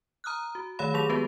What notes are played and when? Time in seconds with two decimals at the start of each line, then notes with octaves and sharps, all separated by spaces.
0.24 A#5 D#6 F6 F#6
0.55 F#4
0.79 D#3 A3 C#5 F5 B5
0.94 F#3 G4 G#4 F7
1.09 G#3 B3 F#4 G4 B4